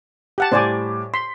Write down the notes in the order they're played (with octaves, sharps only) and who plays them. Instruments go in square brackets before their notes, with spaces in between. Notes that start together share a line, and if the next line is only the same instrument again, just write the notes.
[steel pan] G4 F#5 A5
[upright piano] A2 G3 D6 [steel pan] C5 D5 G#5
[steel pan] C6 [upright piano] B6